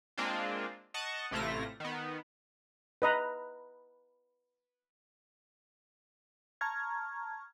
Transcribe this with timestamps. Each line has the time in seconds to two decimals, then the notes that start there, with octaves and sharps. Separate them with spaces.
0.18 G#3 A#3 C4 D4 F4
0.94 D#5 F#5 A5 C#6
1.31 A1 C3 A3 E4 F4 A#6
1.80 D#3 B3
3.02 B4 D#5 A#5
6.61 A5 A#5 C#6 F6 G#6